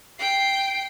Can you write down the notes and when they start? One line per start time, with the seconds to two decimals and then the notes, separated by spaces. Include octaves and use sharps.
0.19 G5 C7